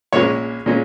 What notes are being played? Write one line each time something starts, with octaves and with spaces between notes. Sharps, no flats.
A#1 A#2 G#3 C#4 C#5
A#2 G#3 C#4